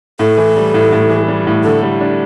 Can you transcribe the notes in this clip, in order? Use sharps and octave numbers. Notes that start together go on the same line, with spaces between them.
A2 A4
E3
G3
A2
A2
E3
G3
A2
D3 A4
G3
D4